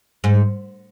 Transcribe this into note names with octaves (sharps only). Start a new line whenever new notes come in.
G#2